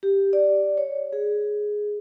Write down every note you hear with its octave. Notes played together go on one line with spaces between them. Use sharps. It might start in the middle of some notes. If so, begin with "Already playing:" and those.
G4
D5
C#5
G#4